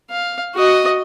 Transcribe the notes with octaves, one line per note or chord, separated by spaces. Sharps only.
F5
F#4 D#5